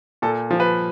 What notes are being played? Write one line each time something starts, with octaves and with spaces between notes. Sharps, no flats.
A#2 A4
F3
B4